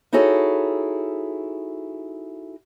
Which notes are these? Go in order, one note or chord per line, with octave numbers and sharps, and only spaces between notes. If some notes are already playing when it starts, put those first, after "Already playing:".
D#4 E4 F#4 G#4 A4 C#5